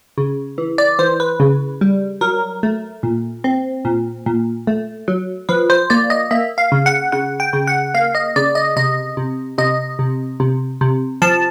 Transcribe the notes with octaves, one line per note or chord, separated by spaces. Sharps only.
C#3
E3
D5
E3 C5
B4
C#3
G3
F#3 A#4
A3
A#2
C4
A#2
A#2
A3
F#3
F3 B4
C5
A#3 D5
D#5
A#3 E5
F5
C#3
F#5
C#3 F#5
G5
C#3
F#5
A#3 F5
D#5
C#3 D5
D#5
C3 D#5
C3
C3 D#5
C3
C3
C3
F3 A5